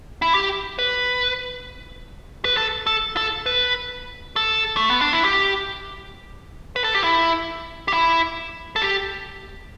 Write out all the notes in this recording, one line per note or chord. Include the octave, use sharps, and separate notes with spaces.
E4
G4
B4
B4
A4
A4
A4
B4
A4
A3
B3
D4
E4
G4
B4
A4
G4
E4
G4
E4
A4
G4